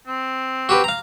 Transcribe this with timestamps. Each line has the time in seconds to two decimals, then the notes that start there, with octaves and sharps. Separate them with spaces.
0.07 C4
0.69 F#4 G4 B4
0.84 F5 A#5